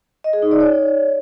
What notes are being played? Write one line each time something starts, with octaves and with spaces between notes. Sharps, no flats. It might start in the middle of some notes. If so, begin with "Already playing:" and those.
D#5
G#4
D#4
D5
C#5